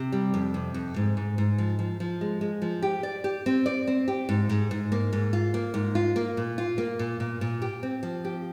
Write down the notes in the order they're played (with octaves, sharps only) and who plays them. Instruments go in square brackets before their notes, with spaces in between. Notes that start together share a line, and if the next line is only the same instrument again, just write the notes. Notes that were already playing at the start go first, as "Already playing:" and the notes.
Already playing: [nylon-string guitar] C3
G3
F2
C3
F2
G#2
G#2
G#2
F3
F3
F3
G#3
G#3
F3
G4
D5
G4
C4
D5
C4
G4
G#2
G#2
G#2
A#3
G#2
F4
A#3
G#2
F4
A#3
A#2
F4
A#3
A#2
A#2
A#2
G4
C4
F3
G4